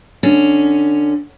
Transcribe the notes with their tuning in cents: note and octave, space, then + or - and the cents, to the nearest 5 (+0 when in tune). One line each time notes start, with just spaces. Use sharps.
D3 +15 C#4 +0